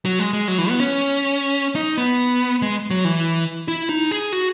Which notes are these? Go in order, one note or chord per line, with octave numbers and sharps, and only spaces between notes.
F#3
G#3
G#3
F#3
E3
B3
C#4
D#4
B3
G#3
F#3
E3
E4
D#4
G#4
F#4